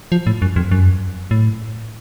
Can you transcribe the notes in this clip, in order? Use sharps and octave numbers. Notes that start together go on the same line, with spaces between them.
F3
A2
F#2
F2
F#2
A2